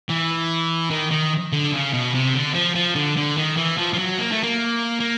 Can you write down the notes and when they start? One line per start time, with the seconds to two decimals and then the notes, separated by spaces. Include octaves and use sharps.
0.09 E3
0.90 D#3
1.11 D#3
1.53 D3
1.72 C#3
1.93 B2
2.14 C3
2.34 D3
2.54 F3
2.75 F3
2.95 D3
3.17 D3
3.37 D#3
3.57 E3
3.77 F3
3.93 F3
3.98 F#3
4.18 A#3
4.31 A3
4.43 A#3
5.00 A#3